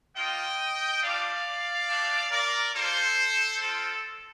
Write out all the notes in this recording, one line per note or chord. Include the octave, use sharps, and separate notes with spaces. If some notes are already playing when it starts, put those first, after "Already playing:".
A#3 F4 D#5 G5
G3 D4 F4 D5 F5
A3 D4 G4
A#4 D5
A#3 F4 A4 C5
C4 F4 A4